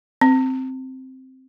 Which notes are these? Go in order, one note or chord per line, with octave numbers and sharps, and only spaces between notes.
C4